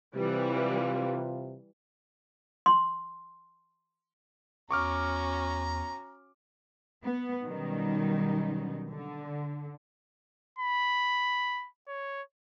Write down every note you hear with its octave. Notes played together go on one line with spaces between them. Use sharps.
C3 E3 G3 F4
C6
E2 C#4 F#4 A#5 C#6 D6 F6
B3
B2 D#3 F#3 G3 C#4 D#4
D3
B5
C#5